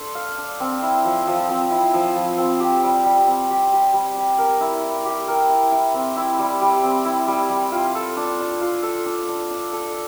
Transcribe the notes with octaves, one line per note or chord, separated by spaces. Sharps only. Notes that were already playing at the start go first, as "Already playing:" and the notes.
Already playing: D4 A4 C5
F5
D4
C4
E4
F3
F3
C4
E4
F3
F3
C4
G4
G3
G3
C4
G4
G3
G3
G4
A#4
E4
E4
G4
A#4
E4
E4
C4
E4
G3
G3
C4
E4
G3
G3
F4
A4
D4
D4
F4
A4
D4
D4
D4
A4